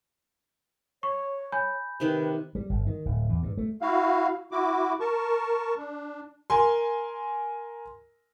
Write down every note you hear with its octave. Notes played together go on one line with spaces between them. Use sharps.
C#5 C#6
G#5 B5 G6
C3 D#3 B4 G5
G3
G1
D#3
D1
E2
G2
A3
E4 F#4 F5
E4 F#4 D6
A#4 A5 C#6
D4
A#4 G#5 C6